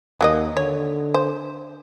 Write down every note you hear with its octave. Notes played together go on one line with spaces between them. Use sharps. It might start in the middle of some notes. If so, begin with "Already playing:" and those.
D#2 F#3 A#3 D#5
D3 C#5
C5